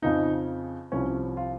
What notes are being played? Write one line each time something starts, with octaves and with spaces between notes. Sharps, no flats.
F2 C#3 F3 D#4
C2 C3 F3 C#4
F4